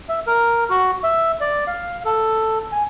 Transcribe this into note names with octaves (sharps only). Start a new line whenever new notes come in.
E5
A#4
F#4
E5
D5
F5
A4
G#5